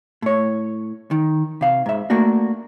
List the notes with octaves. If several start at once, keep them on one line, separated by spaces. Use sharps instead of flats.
A2 C#5
D#3
C3 F5
G#2 E5
A3 A#3 D4 F#4